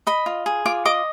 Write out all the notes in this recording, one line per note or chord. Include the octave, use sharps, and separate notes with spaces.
D#5 B5
F4
G#4
F4 D6
D#5 D6